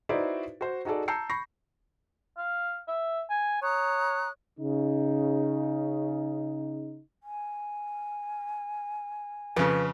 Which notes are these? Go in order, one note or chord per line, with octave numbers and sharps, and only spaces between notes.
D#4 E4 F#4 B4 C5 D5
F#4 C5
D#4 F#4 G#4 A4 D5
A5 A#5 E6 G6 C7 C#7
B5 C#6 G6 A#6 C7
F5
E5
G#5
C#5 A#5 D#6 F#6
C#3 D#4
G#5
F2 C#3 B4